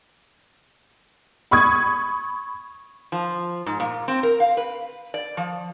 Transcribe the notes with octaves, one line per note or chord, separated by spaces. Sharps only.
B5 C#6 D#6 G#6
F3
G#2
A#2
C4
A#4
F5
B4
D5
F3